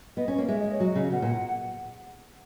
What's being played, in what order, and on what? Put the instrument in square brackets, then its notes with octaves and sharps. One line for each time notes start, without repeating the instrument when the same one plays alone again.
[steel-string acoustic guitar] B3 [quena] D#5
[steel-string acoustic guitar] C#4
[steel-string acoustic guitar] A#3 [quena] C#5
[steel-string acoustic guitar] G#3 [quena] E5
[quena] D#5
C#5
[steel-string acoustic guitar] F#3 [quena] D#5
[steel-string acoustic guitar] C#3
[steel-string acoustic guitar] B2 [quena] F#5
[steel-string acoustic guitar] A#2